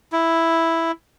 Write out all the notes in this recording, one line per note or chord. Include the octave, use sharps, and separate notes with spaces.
E4